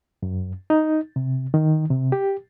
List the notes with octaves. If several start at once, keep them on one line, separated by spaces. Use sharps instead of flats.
F#2
D#4
C3
D#3
C3
G4